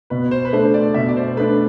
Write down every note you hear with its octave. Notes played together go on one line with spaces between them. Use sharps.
B2 B4
C5
B4
A3 D4 C5
D5
B2 E5
D5
C5
A3 D4 B4